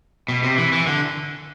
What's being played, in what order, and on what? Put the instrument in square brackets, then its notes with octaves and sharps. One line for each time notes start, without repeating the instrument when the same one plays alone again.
[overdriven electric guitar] B2
C3
E3
E3
D3